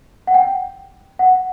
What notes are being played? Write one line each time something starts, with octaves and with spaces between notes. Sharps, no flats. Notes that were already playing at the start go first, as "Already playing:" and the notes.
F#5
G5
F#5